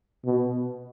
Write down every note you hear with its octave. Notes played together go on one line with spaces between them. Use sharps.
B2